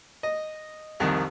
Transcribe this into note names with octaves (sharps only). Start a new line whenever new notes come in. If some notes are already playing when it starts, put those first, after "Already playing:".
D#5
C2 F2 D#3